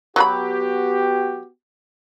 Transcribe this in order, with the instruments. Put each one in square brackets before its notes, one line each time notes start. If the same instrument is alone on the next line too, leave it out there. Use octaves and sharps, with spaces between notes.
[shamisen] F#3 B4 B5 [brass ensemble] B3 F#4 G4